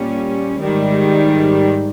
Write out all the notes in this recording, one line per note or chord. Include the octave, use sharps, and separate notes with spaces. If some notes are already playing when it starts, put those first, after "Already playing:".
Already playing: A#2 G3 C#4
G#2 D#3 G3